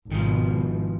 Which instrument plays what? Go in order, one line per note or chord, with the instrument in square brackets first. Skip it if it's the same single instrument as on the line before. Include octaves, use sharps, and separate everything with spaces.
[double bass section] G#1 B2 [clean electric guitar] D#3 F3